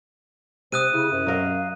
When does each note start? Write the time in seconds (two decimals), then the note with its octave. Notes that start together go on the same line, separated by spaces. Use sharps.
0.72 C3 C5 D#6 F#6 D#7
0.93 C#3 E4
1.12 F#2 C5
1.27 F#3 A#4 D#5 F5